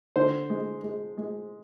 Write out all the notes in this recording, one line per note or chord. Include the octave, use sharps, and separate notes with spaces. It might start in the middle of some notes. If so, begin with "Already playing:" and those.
D3 C5
G#3
G#3
G#3